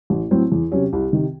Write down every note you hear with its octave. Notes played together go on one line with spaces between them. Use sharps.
A1
A2 F#3 C4
E2
C3 F#3 C#4
C2
C3 D#3